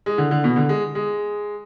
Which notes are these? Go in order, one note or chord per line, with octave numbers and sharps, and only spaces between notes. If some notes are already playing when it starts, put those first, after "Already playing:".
G#3
D3
D3
B2
D3
G#3
G#3